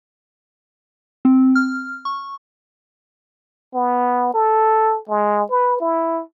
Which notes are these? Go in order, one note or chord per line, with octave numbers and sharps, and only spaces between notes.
C4
F6
C#6
B3
A4
G#3
B4
E4